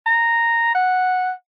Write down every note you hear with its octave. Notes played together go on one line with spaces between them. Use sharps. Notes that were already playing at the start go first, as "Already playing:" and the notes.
A#5
F#5